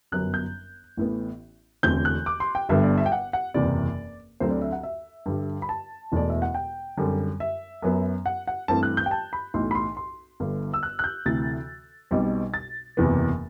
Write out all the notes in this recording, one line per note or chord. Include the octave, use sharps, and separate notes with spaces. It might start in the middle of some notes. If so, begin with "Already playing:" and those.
G1 F#2 F#3 B3 F#6
G6
A1 A2 E3 B3
E1 E2 D3 A3 C4 G6
F#6
D6
C6
G5
G1 G2 D3 G3 B3 E5
D5
E5
G5
F#5
F#5
F#1 E2 C3 D5
D2 D3 F#3 C4 C5
D5
E5
F#5
E5
G2 D3 G3
B5
A5
E1 E2 B2 A3 D5
E5
F#5
G5
F#2 D3 G3 C4
E5
F#2 F#3 B3
F#5
F#5
G2 E3 A3 C4 A5
F#6
G6
G5
A5
B5
B1 A2 E3 C6
B5
C6
C6
G1 G2 D3
E6
F#6
F#6
G6
D2 C3 E3 A6
B1 B2 G3 C4
A6
F#1 E2 C3 E3 B3